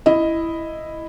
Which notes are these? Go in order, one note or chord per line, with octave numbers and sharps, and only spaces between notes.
E4 D#5